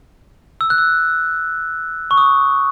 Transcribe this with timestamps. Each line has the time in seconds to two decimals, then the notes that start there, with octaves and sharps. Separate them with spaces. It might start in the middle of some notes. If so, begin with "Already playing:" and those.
0.61 E6
0.70 F#6
0.78 E6
2.11 C#6
2.17 D#6